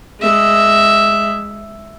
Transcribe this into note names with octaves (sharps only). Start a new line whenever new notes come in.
G#3 E5